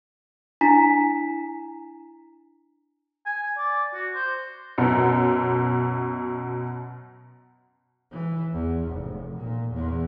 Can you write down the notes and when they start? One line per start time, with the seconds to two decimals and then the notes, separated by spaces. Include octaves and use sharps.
0.61 D4 E4 G#5 A#5 B6
3.26 G#5
3.58 D5
3.94 F#4
4.15 C5
4.78 F#2 B2
8.12 E3
8.53 E2
8.90 F1
9.36 A#2
9.73 E2